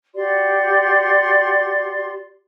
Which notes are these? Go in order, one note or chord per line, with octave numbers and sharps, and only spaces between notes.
F#4 G4 D5 C6